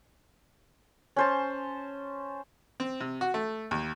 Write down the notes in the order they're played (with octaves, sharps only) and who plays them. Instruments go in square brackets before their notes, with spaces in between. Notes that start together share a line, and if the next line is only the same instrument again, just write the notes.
[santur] C#4 C5 A5
[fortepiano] C4
C3
F#4
A3
D#2